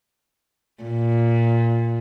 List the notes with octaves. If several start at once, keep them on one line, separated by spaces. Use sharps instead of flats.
A#2